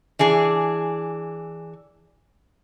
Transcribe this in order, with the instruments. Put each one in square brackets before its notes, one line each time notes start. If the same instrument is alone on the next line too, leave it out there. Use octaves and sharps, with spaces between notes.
[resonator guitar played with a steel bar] E3 D4 G#4